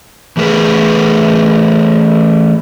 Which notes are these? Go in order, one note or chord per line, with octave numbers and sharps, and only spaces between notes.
E3 A3 G#4 A#4 B4